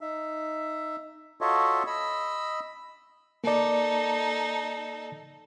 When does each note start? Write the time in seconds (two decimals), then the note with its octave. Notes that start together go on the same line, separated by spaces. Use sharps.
0.01 D#4 E5
1.41 F4 F#4 A4 C#5 D#5 E5
1.87 D#5 B5 E6
3.44 A#3 D#4 A4 D5